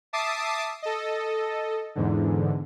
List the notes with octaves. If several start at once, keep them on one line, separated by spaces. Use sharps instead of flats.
E5 A5 D6 D#6 C7
A4 D#5
E2 G#2 D3